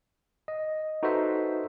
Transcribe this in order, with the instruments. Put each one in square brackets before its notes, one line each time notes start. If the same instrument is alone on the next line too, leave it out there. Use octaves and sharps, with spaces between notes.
[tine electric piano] D#5
D#4 F#4 A4 B4 C5 E5